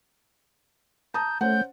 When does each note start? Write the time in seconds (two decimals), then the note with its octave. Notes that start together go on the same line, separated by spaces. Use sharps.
1.14 A5 A#5 D#6 G6
1.41 A3 C#4 C5 F#5 G6